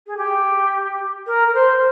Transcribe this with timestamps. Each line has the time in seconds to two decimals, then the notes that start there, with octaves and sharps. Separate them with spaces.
0.06 G#4
0.17 G4
1.26 A#4
1.47 A#4
1.54 C5